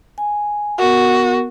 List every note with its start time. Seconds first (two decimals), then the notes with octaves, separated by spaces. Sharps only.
0.18 G#5
0.79 B3 F#4 A#4